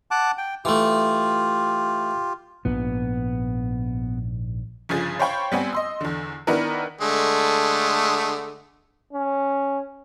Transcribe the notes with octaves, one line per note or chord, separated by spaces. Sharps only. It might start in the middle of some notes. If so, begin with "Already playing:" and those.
F#5 A5 D6
G5
E3 A3 F4 G4
A#1 G#2 B3
G1 C#3 F3 G#4 A6
C5 C#5 F5 G5 B5 C#6
G3 B3 C4 G#5
D#5 C6 E6
E2 D3
D#3 B3 D4 E4 A#4 B4
D3 G#3 A3
C#4